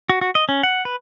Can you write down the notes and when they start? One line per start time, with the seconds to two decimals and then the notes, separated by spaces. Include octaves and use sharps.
0.09 F#4
0.21 F#4
0.35 D#5
0.49 C#4
0.63 F#5
0.85 B4